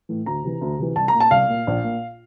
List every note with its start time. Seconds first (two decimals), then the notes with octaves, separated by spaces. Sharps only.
0.09 A2 E3
0.26 D2 A#5
0.44 C3 E3
0.61 D2
0.79 C3 E3
0.96 C2 A5
1.08 A#5
1.14 A#2
1.20 A5
1.31 C2 F5
1.49 A#2
1.67 A#1
1.84 A#2